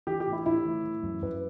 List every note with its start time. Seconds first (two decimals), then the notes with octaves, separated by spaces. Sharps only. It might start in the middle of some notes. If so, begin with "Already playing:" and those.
0.07 E3 G4
0.20 G4
0.26 A2
0.33 E4
0.46 A2 E4
0.65 E3
0.84 E3
1.03 F#2
1.22 F#2 B4